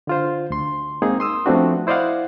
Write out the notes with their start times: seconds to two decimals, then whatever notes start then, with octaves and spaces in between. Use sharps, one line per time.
0.07 D3 F4 C5
0.50 D2 C6
1.02 G#3 A#3 C4 D#4 G#4
1.20 C6 D#6 E6
1.46 F3 A3 B3 C4 D4 F#4
1.87 E4 C5 D5 D#5 F5 F#5